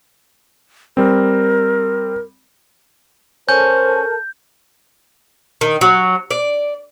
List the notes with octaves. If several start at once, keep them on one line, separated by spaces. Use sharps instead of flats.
G3 C4 A#4
C#4 A4 A#4 C5 A5 G6
D#3
F#3
D5